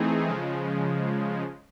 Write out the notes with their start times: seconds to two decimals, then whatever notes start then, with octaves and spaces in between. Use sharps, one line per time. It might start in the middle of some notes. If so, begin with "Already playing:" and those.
Already playing: E3 A3 C4 D#4 G#4
0.27 C#3 F3 G#3